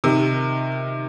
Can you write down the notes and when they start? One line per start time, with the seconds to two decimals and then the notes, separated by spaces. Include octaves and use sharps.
0.04 C3 D#3